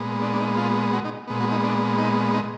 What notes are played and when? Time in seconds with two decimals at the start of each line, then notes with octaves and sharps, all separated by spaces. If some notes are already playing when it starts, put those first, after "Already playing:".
Already playing: A#2 G#3 B3
0.22 D4
0.33 D4
0.40 D#4
0.57 F4
0.93 F#4
1.05 D#4
1.27 A#2 G#3 B3
1.40 F#4
1.51 D#4
1.64 D4
1.98 D#4
2.34 D#4